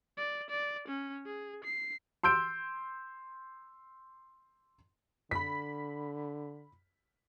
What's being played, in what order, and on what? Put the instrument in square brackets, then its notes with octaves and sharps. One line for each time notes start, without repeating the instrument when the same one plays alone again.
[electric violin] D5
D5
C#4
G#4
C7
[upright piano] C6 E6 G6 D7
[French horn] D3 [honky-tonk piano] B5 B6